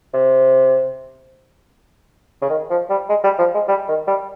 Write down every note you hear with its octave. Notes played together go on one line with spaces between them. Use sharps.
C3
C#3
D#3
F3
G3
G#3
G3
F3
G#3
G3
D#3
G3